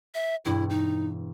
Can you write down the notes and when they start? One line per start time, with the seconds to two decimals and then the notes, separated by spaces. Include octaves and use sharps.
0.14 E5
0.45 E1 G2 E4
0.70 D#4